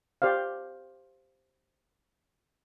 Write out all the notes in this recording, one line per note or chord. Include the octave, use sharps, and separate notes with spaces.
G4 C5 D5 F5